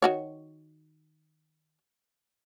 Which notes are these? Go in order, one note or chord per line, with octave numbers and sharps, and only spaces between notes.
D#3 F#4 C#5